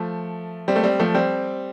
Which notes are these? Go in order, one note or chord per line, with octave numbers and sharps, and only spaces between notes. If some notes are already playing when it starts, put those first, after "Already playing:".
Already playing: F3 A3
G3 C4
A3
G3 C4
F3 A3
G3 C4